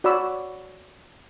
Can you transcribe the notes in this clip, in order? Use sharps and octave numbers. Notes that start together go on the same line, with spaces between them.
F#4 C#5 D5 F#5 B5 E6